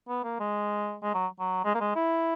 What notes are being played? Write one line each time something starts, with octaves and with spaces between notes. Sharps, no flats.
B3
A#3
G#3
G#3
F#3
F#3
G#3
A#3
G#3
E4